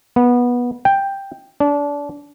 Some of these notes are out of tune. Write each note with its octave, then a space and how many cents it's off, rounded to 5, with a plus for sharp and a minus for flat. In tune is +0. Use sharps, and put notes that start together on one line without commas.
B3 -15
G5 +5
D4 -25